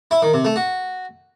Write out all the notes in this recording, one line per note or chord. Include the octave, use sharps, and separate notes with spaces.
E4
D#3
C3
A3
F#4